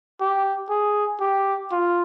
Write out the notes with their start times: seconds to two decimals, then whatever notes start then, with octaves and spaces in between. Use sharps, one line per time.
0.20 G4
0.70 G#4
1.21 G4
1.72 F4